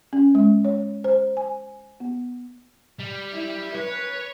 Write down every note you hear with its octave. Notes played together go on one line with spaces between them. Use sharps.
C#4
G#3
C#5
C5
G#5
B3
G3
E4
B4 C#5